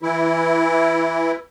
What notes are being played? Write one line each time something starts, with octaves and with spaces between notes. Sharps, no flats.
E3 E4